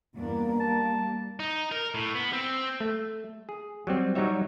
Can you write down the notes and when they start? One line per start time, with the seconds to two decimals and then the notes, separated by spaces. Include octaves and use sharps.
0.15 E2 G2 A#3 D4
0.60 G3 A5
1.39 D#4
1.72 A#4
1.95 A2
2.15 B3
2.33 C4
2.80 A3
3.49 G#4
3.87 F#3 G3 C4
4.15 F#3 G3 D#4 F#4 C#5 E5